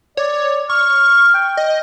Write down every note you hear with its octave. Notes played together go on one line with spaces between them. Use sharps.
C#5 D5
C#6 F6
G5
D#5